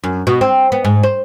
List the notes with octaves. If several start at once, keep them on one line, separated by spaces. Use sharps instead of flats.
F#2
B2
C4
B3
G#2
C5